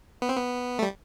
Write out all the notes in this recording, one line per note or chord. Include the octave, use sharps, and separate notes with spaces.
B3
C4
B3
A3
G3